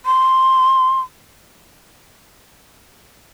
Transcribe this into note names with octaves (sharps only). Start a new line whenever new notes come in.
C6